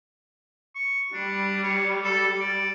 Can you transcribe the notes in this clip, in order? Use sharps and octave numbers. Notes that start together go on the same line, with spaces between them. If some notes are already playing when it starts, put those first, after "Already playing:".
C#6
G3 D4
C#5
A4
D5